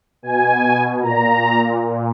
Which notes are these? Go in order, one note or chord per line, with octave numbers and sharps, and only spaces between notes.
B2 G#5
A#2 A#5
A#2